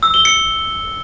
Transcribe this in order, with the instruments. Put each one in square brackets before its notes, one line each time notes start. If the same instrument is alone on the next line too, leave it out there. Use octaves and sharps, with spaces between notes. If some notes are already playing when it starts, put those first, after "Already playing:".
[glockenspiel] E6
G7
C#7